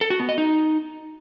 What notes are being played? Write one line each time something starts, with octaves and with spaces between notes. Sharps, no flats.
A4
F#4
B3
D#5
D#4